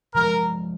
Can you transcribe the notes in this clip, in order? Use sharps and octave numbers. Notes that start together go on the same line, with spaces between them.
C3 F3 G#3 A#4